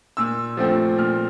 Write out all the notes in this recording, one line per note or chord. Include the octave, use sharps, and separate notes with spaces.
A#2 E6
F3 A3 C4
A#2 F6